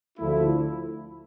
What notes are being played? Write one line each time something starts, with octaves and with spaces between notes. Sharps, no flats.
D2 D3 F3 A3 E4